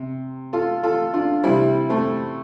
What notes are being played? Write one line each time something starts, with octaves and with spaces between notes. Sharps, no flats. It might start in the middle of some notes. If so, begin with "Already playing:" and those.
Already playing: C3
F4 A4
F4 A4
D4 F4
C3 G3 C4 E4
A3 C4